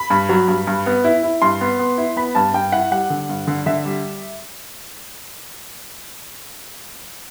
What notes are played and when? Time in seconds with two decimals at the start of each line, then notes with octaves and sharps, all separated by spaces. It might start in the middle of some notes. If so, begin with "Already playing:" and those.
Already playing: B5
0.10 G2
0.29 F#3
0.48 G2
0.67 G2
0.86 B3
1.04 E4
1.23 E4
1.42 G2 C6
1.61 B3
1.79 B3
1.98 E4
2.16 B3 B5
2.35 G2 A5
2.54 G2 G5
2.72 E4 F#5
2.91 G3 F#5
3.10 D3
3.29 G2
3.47 D3
3.66 D3 E5
3.85 G3